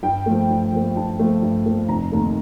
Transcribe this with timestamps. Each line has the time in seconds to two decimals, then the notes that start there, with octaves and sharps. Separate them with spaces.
0.03 G2 G5
0.26 F3 A3
0.50 G2
0.72 F3 A3
0.96 G2 A5
1.19 F3 A3
1.42 G2
1.65 F3 A3
1.89 F1 A#5
2.12 D#2 D#3 A3